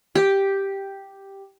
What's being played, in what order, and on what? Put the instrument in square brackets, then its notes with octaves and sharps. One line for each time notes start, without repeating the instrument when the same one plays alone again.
[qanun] G4